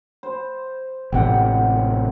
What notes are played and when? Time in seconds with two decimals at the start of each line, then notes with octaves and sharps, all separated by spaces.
0.23 C5
1.12 A1 C3 F#5 G5